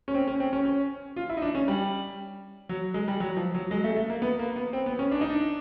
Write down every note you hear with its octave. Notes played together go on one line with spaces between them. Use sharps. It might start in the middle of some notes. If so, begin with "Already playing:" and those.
C#4
C4
C#4
C4
C#4
C#4
F4
E4
D#4
D4
C#4
G3
F#3
G#3
G3
F#3
F3
F#3
G#3
A3
A3
A#3
B3
A#3
B3
C4
B3
C#4
D4
D#4
D4